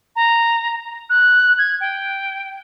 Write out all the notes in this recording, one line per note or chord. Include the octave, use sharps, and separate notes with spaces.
A#5
F#6
G#6
G5